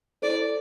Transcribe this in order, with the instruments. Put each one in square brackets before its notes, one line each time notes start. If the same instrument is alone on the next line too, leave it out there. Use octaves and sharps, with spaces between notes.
[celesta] E4 A4 C5 [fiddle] D5